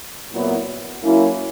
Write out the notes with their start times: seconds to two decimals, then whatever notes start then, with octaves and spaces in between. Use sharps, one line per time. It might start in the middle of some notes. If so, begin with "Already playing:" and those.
0.31 A#2 F#3 B3 E4
1.02 F#3 A#3 C#4 E4